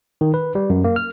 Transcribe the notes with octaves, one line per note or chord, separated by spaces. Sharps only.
D#3
B4
G3
F#2
A#3
F6